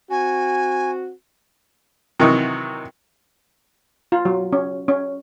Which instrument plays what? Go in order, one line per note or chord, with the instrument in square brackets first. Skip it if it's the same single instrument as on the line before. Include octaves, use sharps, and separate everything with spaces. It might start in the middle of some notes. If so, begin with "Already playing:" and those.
[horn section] C4 F#4 [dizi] G#5
[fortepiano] C3 D#3 E3 F#3 D#4 F#4
[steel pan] F4
F#3
C#4
C#4